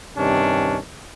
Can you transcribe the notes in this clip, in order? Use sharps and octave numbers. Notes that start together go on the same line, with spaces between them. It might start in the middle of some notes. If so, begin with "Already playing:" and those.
G2 C3 D#3 C#4 D4